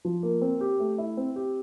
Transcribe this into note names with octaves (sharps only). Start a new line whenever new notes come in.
F3
A#3
C4
G4
A3
E4
C4
G4